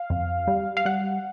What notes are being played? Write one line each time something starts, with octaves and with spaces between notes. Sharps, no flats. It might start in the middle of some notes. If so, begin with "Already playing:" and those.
Already playing: F5
F2
G3
F5
G3 F#5